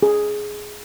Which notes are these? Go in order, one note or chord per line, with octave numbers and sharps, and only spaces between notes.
G#4